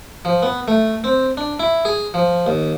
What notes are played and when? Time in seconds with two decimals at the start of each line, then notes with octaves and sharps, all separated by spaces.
0.25 F3
0.43 B3
0.68 A3
1.04 C4
1.37 D4
1.60 E4
1.85 G#4
2.14 F3
2.46 D#2